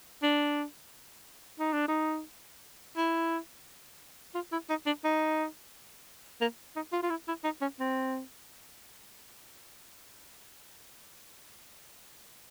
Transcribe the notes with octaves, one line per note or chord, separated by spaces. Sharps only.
D4
D#4
D4
D#4
E4
F4
E4
D#4
D4
D#4
A#3
D#4
F4
F4
E4
E4
D#4
C#4
C4